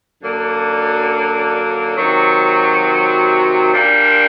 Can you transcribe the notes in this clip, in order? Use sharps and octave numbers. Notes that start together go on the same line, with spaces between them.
F#2 D3 F#3 A#3 D4
C3 D#3 F#3
A#2 G3 A#3 D4